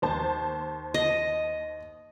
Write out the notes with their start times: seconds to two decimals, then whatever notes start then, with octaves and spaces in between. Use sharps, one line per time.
0.02 D#2 C5 A5
0.94 D#5